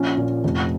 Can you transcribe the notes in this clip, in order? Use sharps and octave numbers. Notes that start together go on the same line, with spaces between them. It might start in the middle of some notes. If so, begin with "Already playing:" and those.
Already playing: A#1 C#4
A#2
F1